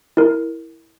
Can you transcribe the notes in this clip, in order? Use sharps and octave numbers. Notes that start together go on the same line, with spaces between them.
E4 A#4